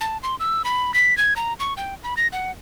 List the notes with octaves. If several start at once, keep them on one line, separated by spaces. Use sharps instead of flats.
A5
C6
E6
B5
B6
G#6
A#5
C#6
G5
B5
A#6
F#5